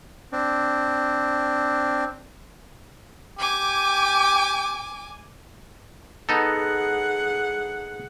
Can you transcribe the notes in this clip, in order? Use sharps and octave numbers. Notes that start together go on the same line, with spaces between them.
C4 D4
G4 G#5 D6
B3 D#4 G#4 A4 F#5